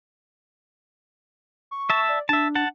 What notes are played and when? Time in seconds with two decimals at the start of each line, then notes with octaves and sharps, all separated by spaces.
1.71 C#6
1.90 E5 A5
2.09 D5
2.29 D4 E5 A5
2.55 F#5 A5